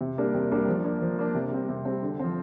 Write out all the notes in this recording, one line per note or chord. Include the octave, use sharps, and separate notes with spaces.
C3
G3 A#3 D4
C3
G3 A#3 D4
F3
A#3 D4
F3
A#3 D4
C3
G3 C4
C3
G3 C4
D3
F3 C4